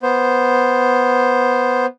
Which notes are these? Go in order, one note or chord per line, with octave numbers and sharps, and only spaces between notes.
B3 C5